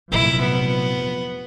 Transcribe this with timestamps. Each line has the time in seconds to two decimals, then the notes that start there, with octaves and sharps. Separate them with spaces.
0.12 F1 A#2 F3 F#3 E4
0.40 B3